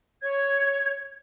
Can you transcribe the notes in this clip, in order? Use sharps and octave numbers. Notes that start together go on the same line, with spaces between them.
C#5 G#6